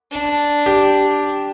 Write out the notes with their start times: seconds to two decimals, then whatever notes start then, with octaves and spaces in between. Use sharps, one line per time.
0.12 D4
0.66 G4